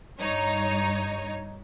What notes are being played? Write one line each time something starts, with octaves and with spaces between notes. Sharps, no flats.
G2 D#4 C#5